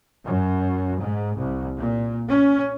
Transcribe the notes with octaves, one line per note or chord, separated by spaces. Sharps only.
F#2
G#2
C2
A#2
C#4